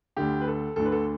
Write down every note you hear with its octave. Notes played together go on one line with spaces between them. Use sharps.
D2 D3 G4
B4
A4
D2 D3 A4
B4
A4